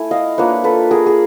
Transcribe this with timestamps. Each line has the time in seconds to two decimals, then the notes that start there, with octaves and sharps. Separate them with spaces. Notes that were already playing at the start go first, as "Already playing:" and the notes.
Already playing: A3 E4 G#5
0.11 D#5 F5
0.38 A#3 D4 F4 B4 C#5
0.64 A4 B4
0.91 G#4 A#4
1.06 G#4